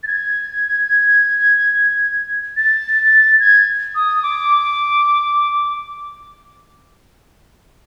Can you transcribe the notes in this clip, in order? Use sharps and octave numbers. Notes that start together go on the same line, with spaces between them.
A6
G#6
A6
G#6
D#6
D6